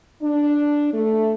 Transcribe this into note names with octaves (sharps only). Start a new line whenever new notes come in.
D4
A3